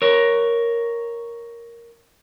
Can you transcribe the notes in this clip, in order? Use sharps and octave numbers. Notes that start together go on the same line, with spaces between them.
A#4 C#5